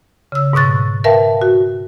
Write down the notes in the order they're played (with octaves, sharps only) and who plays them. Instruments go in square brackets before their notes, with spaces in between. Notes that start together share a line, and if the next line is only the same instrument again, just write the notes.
[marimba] C#3 E6
G#2 B2 C#6 F#6 A6
A#4 B4 E5 F5 G5 A5
F#4